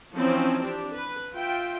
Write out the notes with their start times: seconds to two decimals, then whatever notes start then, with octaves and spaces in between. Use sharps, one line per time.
0.15 E3 F3 C4 C#4 D#4
0.64 D4 G4
0.95 B4
1.36 F4 E5 G5